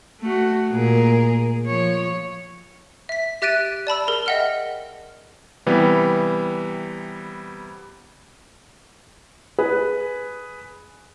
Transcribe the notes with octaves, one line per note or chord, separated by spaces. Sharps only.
A3 F#4
A#2 G#4 A#4
F3 C#5
E5 B6
G4 E5 F#6 A6 D7 D#7
D5 A5 B5 E6
G#4 A#4
D#5 E5 F#5 G5 F6
C3 E3 G3 B3
G#4 B4